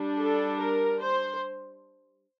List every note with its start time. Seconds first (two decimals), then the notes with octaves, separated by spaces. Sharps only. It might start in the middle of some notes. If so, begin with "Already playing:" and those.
Already playing: G3 D4
0.19 A4
0.60 A#4
1.01 C5